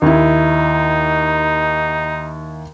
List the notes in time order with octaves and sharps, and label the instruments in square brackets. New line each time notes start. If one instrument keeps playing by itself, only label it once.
[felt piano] D#2 E4 [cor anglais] D#4